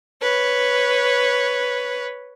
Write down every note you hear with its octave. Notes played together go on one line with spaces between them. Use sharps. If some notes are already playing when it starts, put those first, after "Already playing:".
B4 C#5